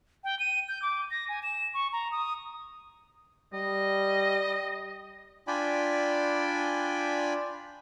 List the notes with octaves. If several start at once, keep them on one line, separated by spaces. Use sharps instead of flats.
G5
D#7
G6
D6
A#6
G#5
E7
C#6
A#5
D#6
G3 D#5
D4 F4 D5 G5 G#5 B5